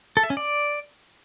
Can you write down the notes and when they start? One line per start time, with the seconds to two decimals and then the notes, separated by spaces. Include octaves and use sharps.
0.17 A4
0.23 E5
0.30 C#4
0.37 D5